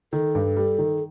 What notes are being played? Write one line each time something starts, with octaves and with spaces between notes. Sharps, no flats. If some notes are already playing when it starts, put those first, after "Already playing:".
D#3 A4
G2
G3
D#3